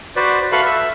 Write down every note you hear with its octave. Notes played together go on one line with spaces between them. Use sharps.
F#4 B4 C5 D5
F#4 A4 B4 E5 F5 B5
E5